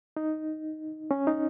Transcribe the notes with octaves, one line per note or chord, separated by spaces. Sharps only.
D#4
C#4
D#4